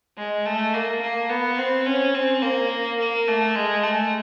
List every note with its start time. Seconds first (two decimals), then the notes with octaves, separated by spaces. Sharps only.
0.17 G#3
0.46 A3
0.74 A#3
1.02 A#3
1.30 B3
1.58 C4
1.86 C#4
2.14 C4
2.42 A#3
2.99 A#3
3.28 A3
3.55 G#3
3.83 A3